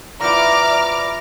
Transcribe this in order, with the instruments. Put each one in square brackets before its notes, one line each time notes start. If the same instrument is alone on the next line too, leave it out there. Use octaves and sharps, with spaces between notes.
[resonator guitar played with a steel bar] F3 B3 E4 [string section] D5 D6 F6 [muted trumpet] A#5